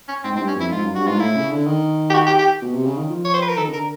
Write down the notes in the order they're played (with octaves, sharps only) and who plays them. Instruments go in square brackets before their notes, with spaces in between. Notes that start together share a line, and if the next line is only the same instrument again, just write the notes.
[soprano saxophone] C#4
[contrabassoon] G#2 [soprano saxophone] C4
[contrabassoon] G#2 [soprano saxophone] C4
[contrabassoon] G2
[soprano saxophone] C#4
[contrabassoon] F2 [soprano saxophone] E4
[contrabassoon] G#2 [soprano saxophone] F4
[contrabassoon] F#2
[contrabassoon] G2 [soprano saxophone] F#4
[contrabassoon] G#2 [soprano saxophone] F4
[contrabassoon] A2 [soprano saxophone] E4
[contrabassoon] C#3
D3
D#3
[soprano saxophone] G4
F#4
G4
G4
[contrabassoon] B2
C3
C#3
D#3
F3
[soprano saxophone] C#5
C5
B4
A#4
[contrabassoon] D#3 [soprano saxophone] A4
[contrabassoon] C#3
[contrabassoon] D3 [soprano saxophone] A#4